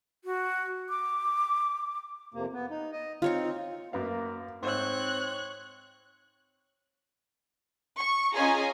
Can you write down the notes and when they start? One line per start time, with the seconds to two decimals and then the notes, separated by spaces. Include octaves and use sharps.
0.24 F#4
0.89 D6
2.34 F2 C3 A#3
2.53 B3
2.70 D#4
2.92 D#5
3.22 C4 D#4 F4 C#5 C#6
3.93 F#2 A#3 B3 F5
4.63 G#2 C4 C5 C#5 E6 F#6
7.99 C#6
8.36 C#4 F4 G#4 D#5 G#5 A#5